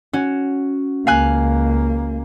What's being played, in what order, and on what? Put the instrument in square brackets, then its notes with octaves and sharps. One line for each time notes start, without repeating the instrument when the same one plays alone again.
[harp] C#4 F#4
[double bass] C#2 A#3 [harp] F5 G#5 F#6